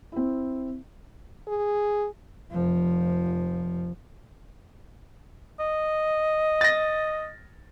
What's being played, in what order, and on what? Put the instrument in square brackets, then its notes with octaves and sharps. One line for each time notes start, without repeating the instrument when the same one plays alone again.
[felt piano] C4 E4
[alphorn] G#4
[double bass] F1 F3
[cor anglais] D#5
[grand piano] A6 A#6